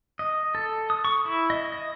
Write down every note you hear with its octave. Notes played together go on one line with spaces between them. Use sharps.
D#5
A4
D#6
C#6
E4
D#5
D#5